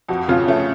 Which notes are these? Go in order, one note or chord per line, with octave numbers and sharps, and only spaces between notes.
F2 F#4
C#3 F4
A3 C#4